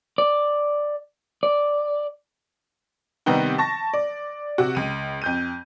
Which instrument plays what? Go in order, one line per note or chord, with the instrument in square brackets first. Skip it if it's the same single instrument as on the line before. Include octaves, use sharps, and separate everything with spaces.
[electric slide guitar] D5
D5
[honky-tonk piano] C3 D#3 G3 B3 C4 D#4
A5 C#6 A#6
D5
C3 F#4
C#2 D#7
F2 G6 D#7